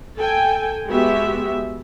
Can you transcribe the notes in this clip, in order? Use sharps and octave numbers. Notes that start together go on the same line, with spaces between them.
A4 G5 G#5
G#3 B3 F#4 G4 E5